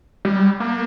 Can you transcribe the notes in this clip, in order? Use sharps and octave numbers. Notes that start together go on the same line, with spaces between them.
G3
A#3